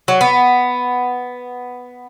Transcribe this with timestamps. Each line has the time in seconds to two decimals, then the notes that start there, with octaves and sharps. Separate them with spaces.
0.08 F#3
0.21 B3